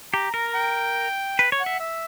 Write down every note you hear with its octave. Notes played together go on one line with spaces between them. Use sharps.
G4 A#5
A#4 A#5
G5
B4
C#5
F#5
E5
E5